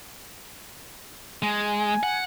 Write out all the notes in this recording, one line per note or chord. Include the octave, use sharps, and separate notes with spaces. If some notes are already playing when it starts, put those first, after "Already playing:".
G#3 G#5
F#5